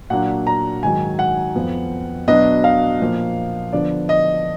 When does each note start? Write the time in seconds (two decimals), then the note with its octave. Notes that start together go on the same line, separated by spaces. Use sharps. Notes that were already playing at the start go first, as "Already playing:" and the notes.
0.10 A#2 F#3 A#3 D4 F#5
0.47 A#5
0.83 G#2 D#3 F#3 G#5
1.19 F#5
1.55 F2 F3 B3
2.28 B2 F#3 B3 D4 D#5
2.64 F5
3.00 A#2 F3 A#3
3.73 D3 F3 B3 D4 D5
4.09 D#5